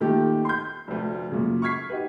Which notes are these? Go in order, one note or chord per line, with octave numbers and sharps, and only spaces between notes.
A#2 D#3 A3 G4 A4
C6 G6
F1 D2
F#2 A#2 C#3
C#6 F6 G#6 B6 C7
D#4 F#4 G4 B4